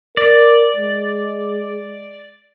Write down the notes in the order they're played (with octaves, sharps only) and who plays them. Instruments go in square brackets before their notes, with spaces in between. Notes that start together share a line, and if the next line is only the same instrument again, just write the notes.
[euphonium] A#4 [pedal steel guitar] D5
[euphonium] G#3